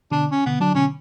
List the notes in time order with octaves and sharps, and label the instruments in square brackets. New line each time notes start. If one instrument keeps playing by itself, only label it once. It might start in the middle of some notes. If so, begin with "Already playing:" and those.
[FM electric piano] B2 D3 [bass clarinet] D4
[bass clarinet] C#4
[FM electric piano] B2 D3 [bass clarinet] B3
[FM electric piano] D3 F#3 [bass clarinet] D4
[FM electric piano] B2 D3 [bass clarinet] C#4